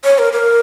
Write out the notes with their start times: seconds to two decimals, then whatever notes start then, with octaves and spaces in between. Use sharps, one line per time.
0.04 C#5
0.18 A#4
0.33 A#4